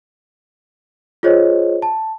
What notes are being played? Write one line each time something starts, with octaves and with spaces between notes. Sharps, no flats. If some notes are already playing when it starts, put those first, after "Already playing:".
F4 G#4 C5 C#5 D#5
A5